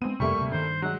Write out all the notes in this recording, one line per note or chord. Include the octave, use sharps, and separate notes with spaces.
G#3 B3 C4 D#7
F2 C3 G3 A3 A#3 C#6
D1 C3
G2 D#3 C5
F#3 G#3 F#5